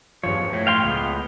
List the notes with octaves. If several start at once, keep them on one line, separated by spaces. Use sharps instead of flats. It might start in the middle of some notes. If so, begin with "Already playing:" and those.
E2 G2 F3 C#5
A2
F5 G5 C6
C#2 B3